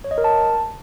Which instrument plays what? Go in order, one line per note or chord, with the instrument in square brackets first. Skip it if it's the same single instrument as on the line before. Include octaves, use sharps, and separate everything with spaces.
[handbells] C#5
D#5
A#4
A5